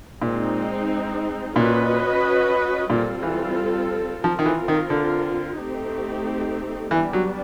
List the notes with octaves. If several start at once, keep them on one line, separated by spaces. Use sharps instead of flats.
A#2 G#3 C4 D#4
A#2 C#4 F#4 B4 D#5
A#2 G3 C4 F4 A4
E3
F3 C4 F4 A#4
D#3
E3
D#3
D3
A3 C4 D#4 G4
E3 G3 B3 D4
F#3